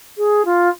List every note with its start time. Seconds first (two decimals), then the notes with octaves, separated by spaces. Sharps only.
0.17 G#4
0.45 F4